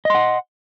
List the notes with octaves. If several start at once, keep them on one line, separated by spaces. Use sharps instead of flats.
D#5 F#5 C6